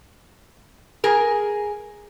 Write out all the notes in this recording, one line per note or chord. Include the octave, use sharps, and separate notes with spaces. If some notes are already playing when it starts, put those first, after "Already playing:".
G#4 A#4